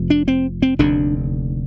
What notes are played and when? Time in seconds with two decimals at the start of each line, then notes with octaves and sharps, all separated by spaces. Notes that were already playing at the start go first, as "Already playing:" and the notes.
Already playing: F1 F2 C3
0.10 D4
0.28 C4
0.62 C4
0.79 F1 D#2 D3 D4